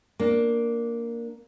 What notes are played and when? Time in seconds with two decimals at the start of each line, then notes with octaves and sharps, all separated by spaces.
0.19 A#3 D4